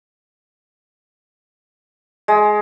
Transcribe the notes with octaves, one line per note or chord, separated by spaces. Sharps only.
G#3